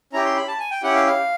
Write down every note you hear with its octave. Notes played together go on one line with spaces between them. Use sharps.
C#4 E4 G4 A#5
C6
B5
A5
G#5
G5
C#4 E4 G4 F#5
F5
F5